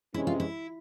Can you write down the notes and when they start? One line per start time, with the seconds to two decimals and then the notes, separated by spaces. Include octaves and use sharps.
0.14 C3 E3 G#3 C#4 E4
0.27 F4
0.40 E4